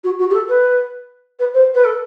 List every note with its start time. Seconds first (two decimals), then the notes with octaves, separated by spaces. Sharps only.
0.04 F#4
0.19 F#4
0.30 G4
0.34 A4
0.49 B4
1.39 B4
1.54 C5
1.74 B4
1.85 A4